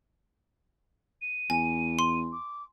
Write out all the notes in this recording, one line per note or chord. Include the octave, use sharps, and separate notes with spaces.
D#7
E2 G#5
C6
D6